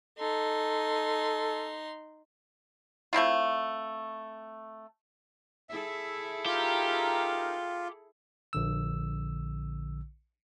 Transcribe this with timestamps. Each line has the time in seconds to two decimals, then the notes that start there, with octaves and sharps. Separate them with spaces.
0.19 D#4 A4 C6
3.13 A3 C4 E4 F4
5.69 E4 G#4 A4 E5
6.46 D#4 F4 G4 A#4
8.53 A#1 D3 E6